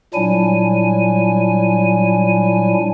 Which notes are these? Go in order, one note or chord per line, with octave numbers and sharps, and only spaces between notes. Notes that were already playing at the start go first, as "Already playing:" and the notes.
A#2 F#3 G3 D4 E4 G#5